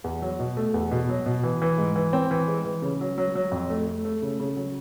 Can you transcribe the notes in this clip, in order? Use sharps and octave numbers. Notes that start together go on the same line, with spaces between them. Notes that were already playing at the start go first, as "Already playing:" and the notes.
E2
F#3
B2
A3
E2
B2
F#3
B2
E3
E3
G#2
E3
C4
E3
G#3
E3
C#3
F#3
F#3
F#3
F2
A3
A3
A3
C#3
C#3
F#3